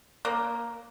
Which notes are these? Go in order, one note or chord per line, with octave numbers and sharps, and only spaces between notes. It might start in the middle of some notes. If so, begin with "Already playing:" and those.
A#3